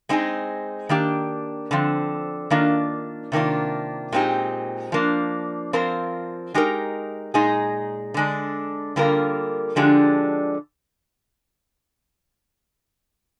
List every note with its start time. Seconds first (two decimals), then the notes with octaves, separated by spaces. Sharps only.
0.09 G#3 C4 D#4 G#4
0.89 D#3 A#3 D4 G4
1.71 D3 F3 C4
2.50 D#3 A#3 D4 F4
3.32 C3 D#3 A#3 D4 F4
4.12 A#2 G#3 C4 D#4 G4
4.92 F3 A#3 D4
5.73 F3 C4 F4 A#4
6.54 G#3 D#4 G4 A#4
7.34 A#2 G#3 D#4 G#4
8.14 D3 G#3 D4
8.96 D3 G3 A#3 F4 A#4
9.76 D3 F3 G#3 D4 G4